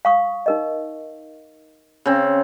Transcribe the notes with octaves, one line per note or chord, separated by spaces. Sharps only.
F5 C#6 D#6
D#4 A#4 D#5
C#3 C4